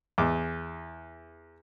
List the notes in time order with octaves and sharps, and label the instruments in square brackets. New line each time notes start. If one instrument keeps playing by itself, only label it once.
[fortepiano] E2 D6